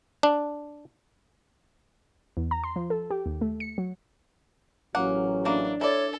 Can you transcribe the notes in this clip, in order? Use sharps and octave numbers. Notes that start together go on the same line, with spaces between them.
D4
E2
A#5
C6
F3
A4
G4
D#2
A3
C#7
F#3
A1 F#3 A#3 C#4 F#5
A#3 D4 E4
E4 A4 C#5 D5